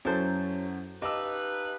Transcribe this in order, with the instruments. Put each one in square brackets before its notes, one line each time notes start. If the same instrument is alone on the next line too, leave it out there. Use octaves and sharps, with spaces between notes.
[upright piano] F#2 F#3 A6 [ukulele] E4 A4 C5 [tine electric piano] F#4 C#5
[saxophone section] D#4 B4 [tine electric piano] G4 F5 A5 [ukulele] D#5 [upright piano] D6 E6